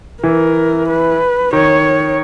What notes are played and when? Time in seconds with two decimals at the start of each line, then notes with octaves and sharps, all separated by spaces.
0.23 E3 A#4
0.88 B4
1.53 D#3 C#5